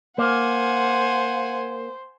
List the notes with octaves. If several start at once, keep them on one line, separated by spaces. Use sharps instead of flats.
A#3 C5 F#5 G#5